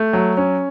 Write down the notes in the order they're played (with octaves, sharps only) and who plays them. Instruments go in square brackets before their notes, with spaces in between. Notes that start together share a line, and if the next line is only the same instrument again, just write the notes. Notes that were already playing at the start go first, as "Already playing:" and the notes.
Already playing: [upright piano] A3
F#3
C#4